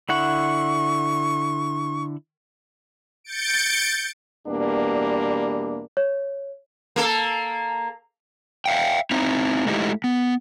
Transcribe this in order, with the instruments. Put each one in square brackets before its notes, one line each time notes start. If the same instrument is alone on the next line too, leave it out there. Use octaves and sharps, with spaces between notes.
[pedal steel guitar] D3 E4 F#5 [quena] C#6
[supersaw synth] G6 A6 C#7 D7
[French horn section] E2 B2 G3 A#3 D4
[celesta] C#5
[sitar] A#3 A4
[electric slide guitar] E5 F5 G5
C4 D#4 E4 A#5
G#3 A3 D#4 E4 G4
B3